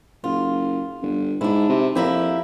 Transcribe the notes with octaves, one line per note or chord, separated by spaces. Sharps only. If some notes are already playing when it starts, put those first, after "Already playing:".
F#1 F4
G1
G#2 D4 E4
C3
F2 A#3 E4 G4